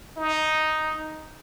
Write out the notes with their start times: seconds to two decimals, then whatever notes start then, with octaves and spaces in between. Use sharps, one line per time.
0.17 D#4